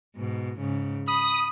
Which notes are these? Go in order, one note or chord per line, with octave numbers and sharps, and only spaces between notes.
G#2 B2
G#2 C#3
B5 D#6